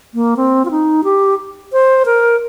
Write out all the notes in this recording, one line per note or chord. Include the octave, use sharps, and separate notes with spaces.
A#3
C4
F4
D#4
G4
C5
A#4